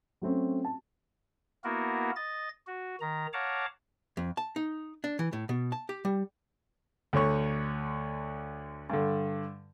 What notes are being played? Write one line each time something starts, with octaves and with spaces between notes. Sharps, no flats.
F#3 A3 C4 C#4
A5
A#3 B3 E4 F#4 A#4
D#5 A6
F#4
D#3 A#5
C#5 F5 F#5 A5 A#5 D6
F2
A5
D#4
D4
E3
A2
B2
A5
G4
G3
D2 D3 C#5 C#6
G2 D3